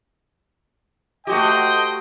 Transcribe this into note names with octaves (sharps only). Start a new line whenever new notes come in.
A3 F#4 G4 C5 D#5 G5